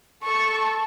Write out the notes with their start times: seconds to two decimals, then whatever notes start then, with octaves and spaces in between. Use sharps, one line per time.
0.24 A4 C#6